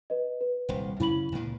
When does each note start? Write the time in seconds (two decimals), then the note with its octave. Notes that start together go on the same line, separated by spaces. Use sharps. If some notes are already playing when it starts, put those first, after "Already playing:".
0.10 B4 D#5
0.41 B4
0.69 D#1 C2 C5
1.00 F#2 C#3 C#4 E4 B5 F#7
1.32 C#2 A#2